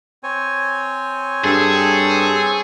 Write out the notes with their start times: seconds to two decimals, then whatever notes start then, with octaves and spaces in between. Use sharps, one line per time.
0.23 C4 C#5 G#5
1.44 G2 G#4 A4